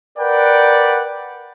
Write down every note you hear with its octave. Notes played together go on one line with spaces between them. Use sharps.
A#4 B4 D5 F#5 G5